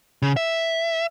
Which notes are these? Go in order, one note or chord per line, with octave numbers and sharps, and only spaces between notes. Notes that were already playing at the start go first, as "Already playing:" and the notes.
C#3
E5